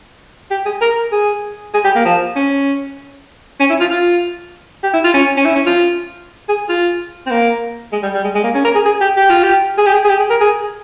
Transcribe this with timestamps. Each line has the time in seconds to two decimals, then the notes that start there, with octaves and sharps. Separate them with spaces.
0.51 G4
0.66 G#4
0.81 A#4
1.12 G#4
1.74 G#4
1.85 G4
1.95 A#3
2.05 F3
2.36 C#4
3.60 C#4
3.70 E4
3.80 F4
3.90 F4
4.83 G4
4.94 E4
5.04 F4
5.14 C#4
5.37 C#4
5.45 E4
5.56 C#4
5.66 F4
6.49 G#4
6.69 F4
7.26 C4
7.31 A#3
7.92 G#3
8.03 G3
8.14 G3
8.24 G#3
8.34 G#3
8.44 A#3
8.55 C#4
8.65 A#4
8.75 G#4
8.86 G#4
9.01 G4
9.17 G4
9.30 F4
9.44 G4
9.78 G#4
9.86 G4
9.93 G#4
10.05 G#4
10.09 G4
10.19 G#4
10.30 A#4
10.41 G#4